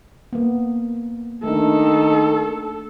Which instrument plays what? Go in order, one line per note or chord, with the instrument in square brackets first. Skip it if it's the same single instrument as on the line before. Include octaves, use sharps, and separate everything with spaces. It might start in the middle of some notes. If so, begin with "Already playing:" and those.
[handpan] A#3 B3
[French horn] D#3 [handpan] A3 D4 [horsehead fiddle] A4